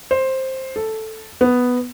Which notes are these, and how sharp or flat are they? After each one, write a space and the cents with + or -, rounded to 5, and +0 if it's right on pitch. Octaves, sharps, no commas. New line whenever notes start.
C5 +10
A4 +0
B3 +0